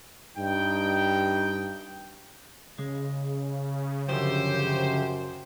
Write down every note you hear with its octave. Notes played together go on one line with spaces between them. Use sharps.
G2 D#4 G5
C#3 G#3
F#2 D3 F3 G4 C5